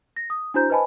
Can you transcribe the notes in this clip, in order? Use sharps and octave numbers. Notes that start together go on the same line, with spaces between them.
A#6
D#6
D4 E4 F#4 C5 A#5 G6
B4 C5 D#5 G#5 A5 B5